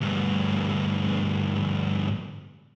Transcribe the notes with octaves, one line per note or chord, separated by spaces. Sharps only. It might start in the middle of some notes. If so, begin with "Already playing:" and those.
D2 G2